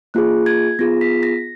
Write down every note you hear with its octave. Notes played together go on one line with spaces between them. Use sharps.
A#3 F4 G#4 F#6
G#6
B3 F4 G#4 A#6
B6
A#6